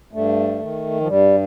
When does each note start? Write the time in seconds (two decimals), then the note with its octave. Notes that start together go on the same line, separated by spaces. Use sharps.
0.13 G2 A3
0.60 D#3
1.00 F3
1.07 G2 G3